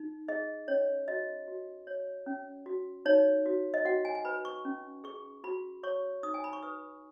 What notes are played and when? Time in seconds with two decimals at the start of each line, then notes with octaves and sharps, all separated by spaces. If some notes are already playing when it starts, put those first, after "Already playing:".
Already playing: D#4
0.28 G#4 D#5
0.68 C#4 C#5
1.08 F#4 D#5
1.48 F#4
1.87 C#5
2.26 C#4
2.66 F#4
3.05 D#4 C#5
3.46 F#4
3.74 D#5
3.85 F#4 F#5
4.05 G#5
4.15 G#5
4.25 B4 B5
4.45 C#6
4.65 C#4
5.04 G#4 C#6
5.44 F#4 B5
5.83 C#5 C#6
6.23 D#4 D#6
6.34 G#5
6.44 B5
6.53 C#6
6.63 B4 D#6